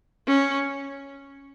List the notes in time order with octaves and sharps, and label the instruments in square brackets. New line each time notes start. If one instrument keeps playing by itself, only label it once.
[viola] C#4